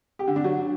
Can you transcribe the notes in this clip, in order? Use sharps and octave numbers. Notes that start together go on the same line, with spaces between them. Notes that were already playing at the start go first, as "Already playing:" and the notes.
G4
D3
D4
F#3